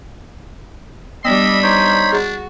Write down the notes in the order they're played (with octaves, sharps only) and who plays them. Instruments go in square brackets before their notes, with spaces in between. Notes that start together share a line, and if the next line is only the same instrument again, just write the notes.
[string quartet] G3 D4 [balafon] B3 [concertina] D#5 E6 [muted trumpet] B5
[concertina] D#4 C5 C#5
[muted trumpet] D4 [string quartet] F#4 [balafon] G#4